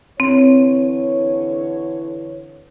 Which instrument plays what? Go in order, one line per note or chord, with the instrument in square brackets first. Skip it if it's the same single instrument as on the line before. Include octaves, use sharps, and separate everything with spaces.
[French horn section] D3 E3 C#5 [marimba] C4